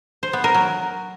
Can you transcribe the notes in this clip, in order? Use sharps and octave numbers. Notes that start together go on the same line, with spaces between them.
C5
B3
A#4
F#3